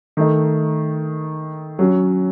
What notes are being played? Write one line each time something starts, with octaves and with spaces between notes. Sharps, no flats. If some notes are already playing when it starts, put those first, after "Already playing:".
D#3 A3 D#4
F#3 C#4 F#4